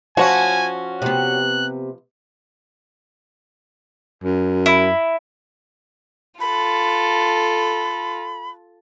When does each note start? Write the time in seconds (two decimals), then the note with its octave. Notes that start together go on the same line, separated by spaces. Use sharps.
0.17 F3 C#4 F#4 C#5 F#5 G#5
1.02 C3 B3 F#6
4.24 F#2
4.66 E4
6.41 F4 A4 B5